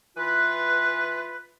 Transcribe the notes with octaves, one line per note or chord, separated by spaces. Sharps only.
E3 F4 B4